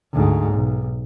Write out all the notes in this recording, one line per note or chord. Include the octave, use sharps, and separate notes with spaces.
D2 G#2
B1